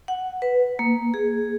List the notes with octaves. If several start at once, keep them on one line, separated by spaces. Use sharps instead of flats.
F#5
B4
A#3
G#4